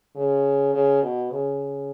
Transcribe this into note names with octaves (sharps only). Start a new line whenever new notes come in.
C#3
C#3
B2
C#3